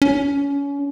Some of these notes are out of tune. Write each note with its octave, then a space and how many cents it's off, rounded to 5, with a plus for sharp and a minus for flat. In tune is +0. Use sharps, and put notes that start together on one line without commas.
C#4 +30